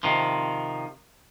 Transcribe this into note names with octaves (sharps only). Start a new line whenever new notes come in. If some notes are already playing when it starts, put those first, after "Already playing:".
C3 D#3 F3